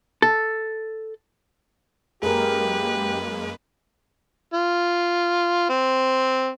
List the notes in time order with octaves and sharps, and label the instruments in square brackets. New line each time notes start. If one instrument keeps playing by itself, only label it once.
[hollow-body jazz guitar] A4
[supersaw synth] F#2 G#3 A#3 [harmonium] G4 [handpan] G#4 A#4 [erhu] B4
[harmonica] F4
C4